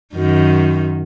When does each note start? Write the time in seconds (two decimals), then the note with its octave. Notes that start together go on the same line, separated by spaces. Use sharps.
0.13 F#2 D#3